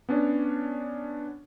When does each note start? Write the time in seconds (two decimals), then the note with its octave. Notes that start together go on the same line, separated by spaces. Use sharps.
0.09 B3 C#4 D4 C#5